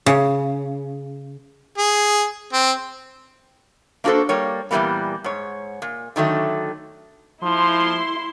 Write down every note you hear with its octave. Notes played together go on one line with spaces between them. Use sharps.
C#3
G#4
C4
A#3 D4 F#4 G#4 A4 C5
G3 A#3 C#5
A#2 E3 F3 G3 A#3 B3
G#2 C#5
A#2
D3 D#3 F#3 A3
F3 E4 C6